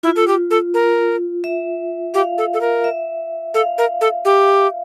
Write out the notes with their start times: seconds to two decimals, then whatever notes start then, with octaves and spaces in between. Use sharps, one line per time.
0.03 E4 F4
0.16 A4
0.27 G4
0.50 A4
0.74 A#4
1.44 E5
2.14 G4 F5
2.38 A4
2.54 A4
2.61 A#4
2.84 E5
3.54 A4 F5
3.78 A#4
4.01 A4
4.25 G4